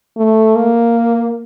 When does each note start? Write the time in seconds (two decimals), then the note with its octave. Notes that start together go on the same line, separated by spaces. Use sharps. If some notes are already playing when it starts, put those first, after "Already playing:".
0.17 A3
0.56 A#3